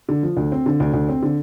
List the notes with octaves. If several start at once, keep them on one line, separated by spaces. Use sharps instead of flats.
D3
F3
D2
C4
D3
D2
D2
C4
D3